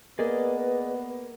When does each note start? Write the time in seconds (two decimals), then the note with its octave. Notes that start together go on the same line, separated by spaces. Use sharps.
0.19 A#3 B3 G#4 B4 D5 D#5